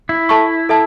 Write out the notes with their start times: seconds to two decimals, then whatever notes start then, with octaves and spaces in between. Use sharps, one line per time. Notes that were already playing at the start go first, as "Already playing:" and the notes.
0.09 E4
0.29 A4 E5 A5 C#6
0.69 A4 E5 A5